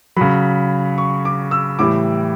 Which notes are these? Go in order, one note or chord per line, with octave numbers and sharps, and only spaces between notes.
C#3 F#3 B5
C#6
D6
E6
A2 E3 G3 D6